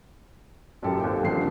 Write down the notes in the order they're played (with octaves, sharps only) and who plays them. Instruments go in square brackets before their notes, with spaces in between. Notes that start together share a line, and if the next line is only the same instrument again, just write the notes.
[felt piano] F#1 F#2 A#2 G4 A4 G5
D#2 C4 G5
D#1 D3 F3 C7